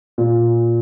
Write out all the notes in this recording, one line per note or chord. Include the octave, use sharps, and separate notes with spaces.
A#2